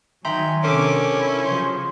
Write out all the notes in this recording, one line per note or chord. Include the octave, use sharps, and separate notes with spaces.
D#3 F#3 E5 G5 G#5 A#5 C6
C3 C#4 D4 A4 A#4 D6
E4
C#3 F3 F#3 C6